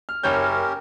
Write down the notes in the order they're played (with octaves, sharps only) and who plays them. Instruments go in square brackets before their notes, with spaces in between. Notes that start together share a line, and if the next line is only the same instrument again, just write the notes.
[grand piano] F6
[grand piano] F#1 C#5 G6 [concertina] C#4 G4 A#4